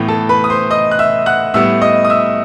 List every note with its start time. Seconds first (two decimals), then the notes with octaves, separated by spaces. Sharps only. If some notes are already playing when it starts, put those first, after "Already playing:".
Already playing: A2 E3 B3 G5
0.08 A4 A5
0.29 B4 B5
0.44 D#6
0.50 C5 C6
0.71 D#5 D#6
0.91 F#6
0.99 E5 E6
1.26 F#5 F#6
1.54 A2 G3 B3 E5 E6
1.82 D#5 D#6
2.05 D#6
2.10 E5 E6